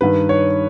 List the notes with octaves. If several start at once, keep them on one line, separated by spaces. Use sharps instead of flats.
G2 D#3 B4
C#5